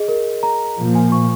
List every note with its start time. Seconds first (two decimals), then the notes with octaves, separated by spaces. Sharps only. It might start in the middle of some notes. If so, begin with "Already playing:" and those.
Already playing: G#4 D#5
0.08 A#4
0.43 A#5
0.77 A#2 F3 A#3
0.95 G#5
1.12 C#6